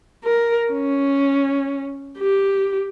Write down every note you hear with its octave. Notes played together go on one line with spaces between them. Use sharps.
A#4
C#4
G4